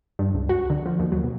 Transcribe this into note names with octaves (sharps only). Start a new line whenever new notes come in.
G2
C#2
F#4
D3
F3
D#2
F#3
B2